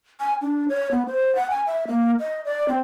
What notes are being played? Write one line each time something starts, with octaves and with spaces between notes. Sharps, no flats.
G#5
D4
C#5
B3
C5
F#5
G#5
E5
A#3
D#5
D5
C4